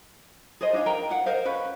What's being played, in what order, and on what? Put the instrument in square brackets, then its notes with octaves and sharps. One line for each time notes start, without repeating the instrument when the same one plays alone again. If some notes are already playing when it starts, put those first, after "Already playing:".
[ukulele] G#4 A#4 C5 D#5
D4 D#4 G#4 F5
A#4 G5 A#5
F5 F#5
A#4 C5 D#5 F5
C#4 B4